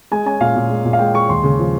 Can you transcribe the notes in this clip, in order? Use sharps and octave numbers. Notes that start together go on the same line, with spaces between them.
G#3 G#5
C#4 G#5
A#2 F5
A#2
G#3
A#2
F5
G#3 G5
G#3 C#6
D#2 C6
C#3
F3